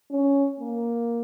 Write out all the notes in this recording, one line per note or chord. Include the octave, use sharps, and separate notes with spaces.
C#4
A#3